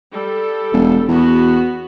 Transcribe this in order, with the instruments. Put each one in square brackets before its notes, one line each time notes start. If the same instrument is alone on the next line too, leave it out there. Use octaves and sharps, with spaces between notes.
[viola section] G3 A4
[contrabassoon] E1
[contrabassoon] E2 [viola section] B3 F#4